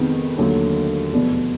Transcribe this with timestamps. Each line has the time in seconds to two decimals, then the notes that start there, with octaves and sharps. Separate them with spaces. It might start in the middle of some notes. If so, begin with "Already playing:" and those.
Already playing: F2 C3 D#3 G#3 B3
0.38 D#2 D3 F#3 A3
1.13 F1 E2 B2